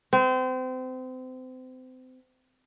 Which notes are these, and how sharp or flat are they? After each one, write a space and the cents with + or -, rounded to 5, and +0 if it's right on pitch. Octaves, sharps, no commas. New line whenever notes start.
C4 -30